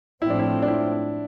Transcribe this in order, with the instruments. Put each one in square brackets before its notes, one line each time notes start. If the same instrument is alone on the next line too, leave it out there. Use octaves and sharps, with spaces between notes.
[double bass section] A2 F3 C4 [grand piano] E4
[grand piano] D4
E4
D4
E4